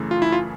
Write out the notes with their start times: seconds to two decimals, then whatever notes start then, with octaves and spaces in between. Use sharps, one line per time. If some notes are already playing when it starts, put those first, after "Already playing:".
Already playing: F#2 C#3 E3 A3
0.11 F4
0.22 E4
0.32 F4